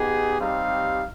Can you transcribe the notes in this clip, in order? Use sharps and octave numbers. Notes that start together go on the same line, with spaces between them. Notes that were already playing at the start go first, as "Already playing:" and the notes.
Already playing: B3 D#4 G4 G#4
G3 C4 D#4 G4 F5